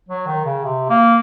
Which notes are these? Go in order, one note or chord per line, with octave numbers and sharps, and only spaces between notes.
F#3
D#3
C#3
C3
A#3